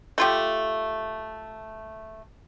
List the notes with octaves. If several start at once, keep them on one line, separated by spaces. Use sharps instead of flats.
A3 F4 G4